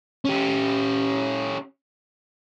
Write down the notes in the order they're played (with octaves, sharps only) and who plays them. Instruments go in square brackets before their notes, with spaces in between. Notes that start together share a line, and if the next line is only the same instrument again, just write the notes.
[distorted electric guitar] C#4 G4